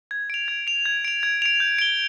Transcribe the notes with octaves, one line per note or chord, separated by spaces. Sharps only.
G#6
D7 F7
G#6
D7 F7
G#6
D7 F7
G#6
D7 F7
G6
D7 G7